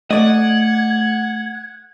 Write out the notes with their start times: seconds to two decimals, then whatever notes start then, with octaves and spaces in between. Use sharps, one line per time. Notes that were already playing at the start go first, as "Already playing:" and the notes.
0.11 A3 D5 D#5 F#5 G#6